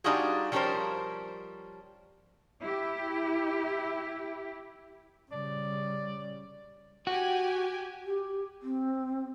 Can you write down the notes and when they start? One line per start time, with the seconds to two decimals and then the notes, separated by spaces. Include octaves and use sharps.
0.04 G3 D4 D#4 F4 F#4 G#4
0.52 F3 G3 C#4 D4 A#4 C5
2.61 E4 G4
5.32 C#3 G3 D5
7.07 F#4 G4 G#5
8.04 G4
8.62 C4